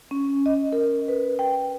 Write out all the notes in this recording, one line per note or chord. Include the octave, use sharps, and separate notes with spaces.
C#4
D#5
A#4
B4
G5